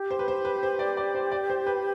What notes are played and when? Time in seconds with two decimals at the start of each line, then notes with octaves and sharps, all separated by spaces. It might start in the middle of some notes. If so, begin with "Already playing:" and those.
Already playing: G4
0.11 C5
0.19 B4
0.28 C5
0.45 B4
0.63 C5
0.79 D5
0.97 D5
1.15 C5
1.31 D5
1.50 C5
1.67 B4